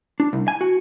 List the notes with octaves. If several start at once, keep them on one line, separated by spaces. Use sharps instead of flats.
D4
C2
G#5
F#4